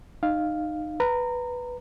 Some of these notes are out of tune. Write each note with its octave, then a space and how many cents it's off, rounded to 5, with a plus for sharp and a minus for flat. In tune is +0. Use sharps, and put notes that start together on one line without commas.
D#4 -20 F5 +0
B4 +0 A#5 -20